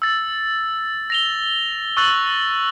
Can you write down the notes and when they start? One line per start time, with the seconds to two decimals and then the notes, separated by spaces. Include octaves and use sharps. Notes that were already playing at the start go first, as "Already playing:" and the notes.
0.02 E6 A6
1.10 A#6 F7 G7
1.97 C#6 E6 F#6 A6 F#7